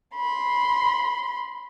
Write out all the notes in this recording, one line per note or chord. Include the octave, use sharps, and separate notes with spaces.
B5 C6